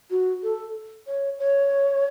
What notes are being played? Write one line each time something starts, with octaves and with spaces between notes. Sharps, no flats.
F#4
A4
C#5
C#5